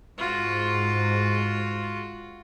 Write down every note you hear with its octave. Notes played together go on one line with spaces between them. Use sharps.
G#2 F4 F#4